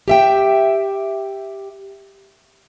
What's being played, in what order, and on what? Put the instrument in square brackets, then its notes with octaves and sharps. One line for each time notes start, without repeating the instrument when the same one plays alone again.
[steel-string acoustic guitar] G4 E5 G5